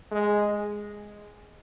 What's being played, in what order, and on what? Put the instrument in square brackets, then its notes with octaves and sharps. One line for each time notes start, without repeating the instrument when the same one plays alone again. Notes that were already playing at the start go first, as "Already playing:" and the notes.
[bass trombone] G#3